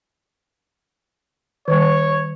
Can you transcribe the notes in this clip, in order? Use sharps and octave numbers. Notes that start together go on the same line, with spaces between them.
D#3 G3 C#5